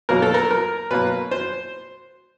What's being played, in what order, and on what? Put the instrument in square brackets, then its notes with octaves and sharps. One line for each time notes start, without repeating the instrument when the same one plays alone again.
[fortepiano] B2 F#3 A#3 A#4
A4
A#4
A#4
B2 F#3 A#3 B4
C5